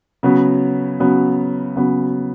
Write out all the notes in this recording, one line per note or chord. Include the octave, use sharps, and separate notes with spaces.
C#3 F#3 B3
C#3 F#3 B3
C#3 F#3 B3